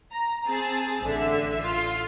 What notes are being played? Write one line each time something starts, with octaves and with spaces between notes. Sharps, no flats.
A#5
C4 G#4 A5
A1 D3 E5 E6
F4